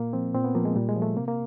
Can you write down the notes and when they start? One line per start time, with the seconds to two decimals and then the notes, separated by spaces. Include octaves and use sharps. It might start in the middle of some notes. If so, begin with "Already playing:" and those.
Already playing: A#2 A#3
0.13 F3 C4
0.34 A#2 C4
0.44 B3
0.55 F3 A#3
0.65 G#3
0.76 A#2 G3
0.89 G#3
0.96 F3
1.02 A3
1.16 C3 A#3
1.28 A#3